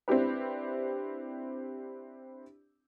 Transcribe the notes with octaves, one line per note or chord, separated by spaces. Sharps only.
C4 D4 E4 G4 B4